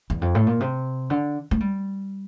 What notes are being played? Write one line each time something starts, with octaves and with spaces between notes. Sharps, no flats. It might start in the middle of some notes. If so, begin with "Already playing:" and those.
E2
F2
A2
A#2
C3
D3
A3
G3